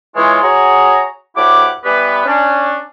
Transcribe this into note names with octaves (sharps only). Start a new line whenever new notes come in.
E3 G#3 F4 C#5
F#4 G#4 C#5 A#5
D2 A2 E4 G4 F#5 D6
E3 G3 B3 G4 B4
C#4 D4